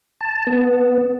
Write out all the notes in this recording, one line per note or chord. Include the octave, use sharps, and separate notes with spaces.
A5
B3